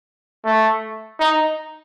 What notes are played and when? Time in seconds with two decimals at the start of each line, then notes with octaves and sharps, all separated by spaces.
0.45 A3
1.20 D#4